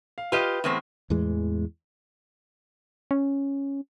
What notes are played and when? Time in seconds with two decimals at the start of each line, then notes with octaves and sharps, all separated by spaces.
0.18 F5
0.32 F4 G4 B4 D#5 F6
0.64 E2 A2 C4
1.10 E2 A2 E3 G#3
3.11 C#4